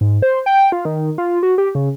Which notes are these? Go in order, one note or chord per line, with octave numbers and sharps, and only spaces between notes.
G#2
C5
G5
F4
D#3
F4
F#4
G4
C#3